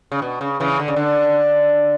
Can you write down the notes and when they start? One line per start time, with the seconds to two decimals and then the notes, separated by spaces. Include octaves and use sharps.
0.12 C#3
0.22 B2
0.41 C#3
0.60 C#3 E3
0.79 D3
0.88 C#3
0.96 D3